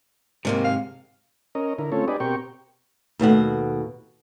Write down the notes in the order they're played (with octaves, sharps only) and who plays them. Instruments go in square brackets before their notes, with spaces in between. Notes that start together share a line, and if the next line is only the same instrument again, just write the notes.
[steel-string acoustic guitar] D#2 A#3 C4 [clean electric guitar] G#2 C3
[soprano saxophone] F5
[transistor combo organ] C#4 A#4 D#5
D3 E4 A#4
A3 C4 C#4 F4 A4 C#5
D4 G4 G#4 B4 D5 D#5
B2 C4 G4 A#4 G5 C#6
[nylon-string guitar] D#2 B2 A3 F#5